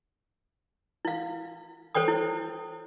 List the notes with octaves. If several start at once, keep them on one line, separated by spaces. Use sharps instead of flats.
E4 F5
A4 C5 C#5 G5 D#6
E4